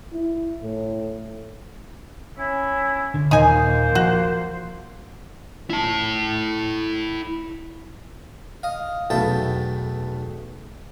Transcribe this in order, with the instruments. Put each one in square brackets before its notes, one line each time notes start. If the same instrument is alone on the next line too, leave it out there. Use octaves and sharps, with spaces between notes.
[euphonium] E4
A2
[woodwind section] C#4 E4
[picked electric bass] D3
[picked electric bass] D#2 A#2 [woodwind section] A#3 C5 [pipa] D#4 G#5
[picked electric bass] F3 [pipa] F#4
[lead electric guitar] E4 A5
[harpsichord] D#5 F5
B1 E2 A3 E4 G5 A5